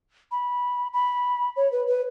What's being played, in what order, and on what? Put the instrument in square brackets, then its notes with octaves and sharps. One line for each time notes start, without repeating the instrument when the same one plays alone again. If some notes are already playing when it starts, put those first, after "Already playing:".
[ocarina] B5
B5
C#5
B4
B4